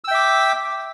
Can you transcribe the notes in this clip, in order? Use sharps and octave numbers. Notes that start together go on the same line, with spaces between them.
E5 G5 D6 E6